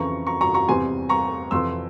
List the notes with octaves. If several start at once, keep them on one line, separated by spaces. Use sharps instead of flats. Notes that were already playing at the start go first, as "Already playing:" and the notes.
Already playing: F2 C#3 E3 A#5 C#6
A#5 C#6
A#5 C#6
A#5 C#6
E2 C3 E3 G3 C4 G#5 C6
A#5 C#6
F2 C3 E3 C6 E6